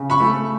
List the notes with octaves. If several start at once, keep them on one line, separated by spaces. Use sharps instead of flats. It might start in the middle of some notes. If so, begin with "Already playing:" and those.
Already playing: C#3
B5 C#6
A3